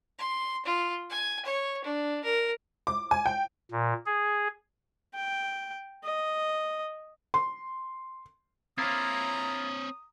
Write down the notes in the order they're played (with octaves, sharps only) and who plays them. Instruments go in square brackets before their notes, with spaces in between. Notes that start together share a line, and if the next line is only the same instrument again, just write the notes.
[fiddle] C6
F4
G#5
C#5
D4
A#4
[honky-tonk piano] D6
G#5
G5
[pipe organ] A#2
G#4
[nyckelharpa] G5
D#5
[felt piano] C6
[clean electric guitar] A#3 E4 F4 [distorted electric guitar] C4 C#5 [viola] A#5 [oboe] D#6